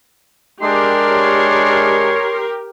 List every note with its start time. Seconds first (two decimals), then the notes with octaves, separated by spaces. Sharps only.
0.62 G#3 D4 G4 A#4 C6
1.11 C#5